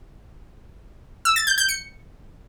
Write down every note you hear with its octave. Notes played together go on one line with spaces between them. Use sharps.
E6
A6
G6
G6
C#7